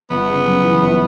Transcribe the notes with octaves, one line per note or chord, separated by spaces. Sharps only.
G1 B3
C#3
F#2
E3
G1